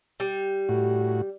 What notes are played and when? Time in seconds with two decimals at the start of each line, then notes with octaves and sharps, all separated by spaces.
0.20 G3
0.69 A2 F#4